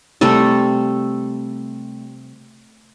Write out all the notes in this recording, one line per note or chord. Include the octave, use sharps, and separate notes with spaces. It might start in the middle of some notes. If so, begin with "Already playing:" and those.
C3 G3 A3 A4